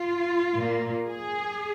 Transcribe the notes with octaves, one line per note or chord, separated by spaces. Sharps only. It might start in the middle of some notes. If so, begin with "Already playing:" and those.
Already playing: F4
A#2 A#3
G#4